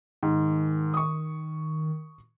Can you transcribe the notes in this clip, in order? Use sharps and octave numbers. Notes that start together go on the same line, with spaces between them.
G#2 D#3
C#6 D#6